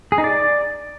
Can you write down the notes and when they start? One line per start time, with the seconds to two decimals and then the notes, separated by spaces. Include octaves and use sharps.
0.12 G#4
0.18 D#4
0.24 D5